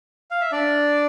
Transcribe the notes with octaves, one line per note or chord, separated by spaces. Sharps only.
F5
E5
D4 D5